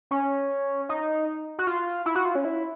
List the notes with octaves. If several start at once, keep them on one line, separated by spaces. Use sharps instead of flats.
C#4
D#4
F#4
F4
E4
F#4
F4
C#4
E4